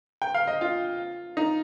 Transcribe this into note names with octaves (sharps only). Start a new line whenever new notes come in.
G5
F5
D#5
F4
D#4